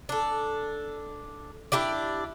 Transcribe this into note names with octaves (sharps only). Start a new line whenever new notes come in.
D4 A4
D4 E4 G4 D5